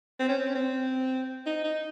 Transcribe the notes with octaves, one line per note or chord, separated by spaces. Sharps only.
C4
C#4
C4
C#4
C4
D#4
D#4